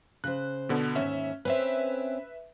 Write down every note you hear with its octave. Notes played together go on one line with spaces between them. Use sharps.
C#3 C5 F#6
B2 D3 B3
D#2 G#2 C#4 E5
C4 C#4 B4 E5